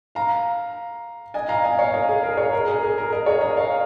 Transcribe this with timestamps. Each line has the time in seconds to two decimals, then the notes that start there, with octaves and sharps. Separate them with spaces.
0.15 F5 A#5
1.34 D#5 G#5
1.49 F5 A#5
1.63 D#5 G#5
1.79 C#5 F5
1.94 A#4 D#5
2.09 G#4
2.23 A#4
2.37 G#4 C#5
2.53 A#4
2.68 G#4
2.83 G#4
2.98 A#4
3.13 A#4 D#5
3.26 G#4 C#5
3.41 A#4 D#5
3.57 C#5 F5